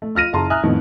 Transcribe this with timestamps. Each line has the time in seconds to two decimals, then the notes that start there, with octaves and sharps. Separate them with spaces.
0.02 A3
0.15 F4 F6 A#6 D#7
0.33 F#1 G#4 A5 A#5 C6
0.50 E5 G#5 A#5 D#6 F6 F#6
0.63 F2 A2 D#3 B3